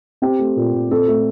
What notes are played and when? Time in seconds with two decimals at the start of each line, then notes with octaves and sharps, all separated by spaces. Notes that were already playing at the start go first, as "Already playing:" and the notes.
0.22 C4 G4
0.39 A3
0.56 A#2
0.73 A#2
0.91 C4 A4
1.08 A3